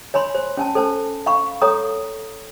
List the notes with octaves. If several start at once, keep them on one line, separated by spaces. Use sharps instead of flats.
C#5 G#5 B5 C6
C5
C#4 G#5 A5
A4 C5 G5 A5
F5 G5 B5 C#6
A4 C#5 G5 A#5 D#6